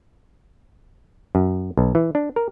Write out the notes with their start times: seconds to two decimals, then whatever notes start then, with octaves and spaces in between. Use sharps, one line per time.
1.35 F#2
1.77 B1
1.95 E3
2.15 D4
2.36 A#4